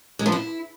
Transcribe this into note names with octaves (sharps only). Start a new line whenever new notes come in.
G#3
F3
E4